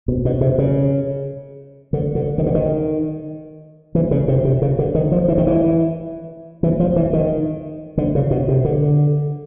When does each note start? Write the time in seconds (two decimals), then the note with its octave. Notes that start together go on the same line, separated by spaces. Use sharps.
0.08 B2
0.25 B2
0.41 C3
0.58 C#3
1.93 D3
2.15 D3
2.38 D#3
2.46 D3
2.55 D#3
3.95 E3
4.11 C#3
4.28 C3
4.45 C3
4.62 C#3
4.79 D3
4.95 D#3
5.12 F3
5.28 E3
5.38 D#3
5.47 E3
6.63 E3
6.80 F3
6.96 E3
7.13 D#3
7.98 D3
8.15 C#3
8.31 B2
8.48 C3
8.65 D3